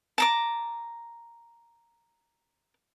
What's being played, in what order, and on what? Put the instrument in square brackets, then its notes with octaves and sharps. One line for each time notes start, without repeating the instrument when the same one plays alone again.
[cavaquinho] A5 A#5 D6